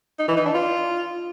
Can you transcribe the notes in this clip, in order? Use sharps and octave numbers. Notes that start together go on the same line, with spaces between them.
D#4
E3
D#4
D4
F4